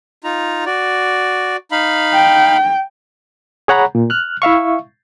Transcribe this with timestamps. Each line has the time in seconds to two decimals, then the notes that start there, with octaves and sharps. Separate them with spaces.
0.24 D#4 F4 A#5
0.66 F#4 D5
1.72 D#4 F5 B5
2.14 G5
3.68 G#4 C#5 F#5 A#5 B5
3.95 A#2
4.10 F6 F#6
4.42 E4 E5 F5 C#6